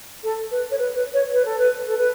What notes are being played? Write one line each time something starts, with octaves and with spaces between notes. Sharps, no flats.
A4
B4
C#5
B4
B4
C#5
B4
A4
B4
A4
B4